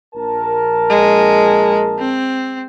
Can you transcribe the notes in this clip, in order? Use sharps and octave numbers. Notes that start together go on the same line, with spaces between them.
A#1 A#4 A5
G#3
C4